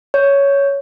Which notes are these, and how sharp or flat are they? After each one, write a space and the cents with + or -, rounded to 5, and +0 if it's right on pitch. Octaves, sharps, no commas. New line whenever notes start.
C#5 +10